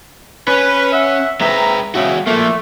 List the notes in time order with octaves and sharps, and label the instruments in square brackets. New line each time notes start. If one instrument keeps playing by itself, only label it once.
[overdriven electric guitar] C#4 [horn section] B4
[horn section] E5 F#5
[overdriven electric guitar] G#3 B4 [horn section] C4 E5 A#5
[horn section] C#3 E5 [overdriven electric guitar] G#3 F#4
[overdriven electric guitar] F3 A#3 [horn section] A3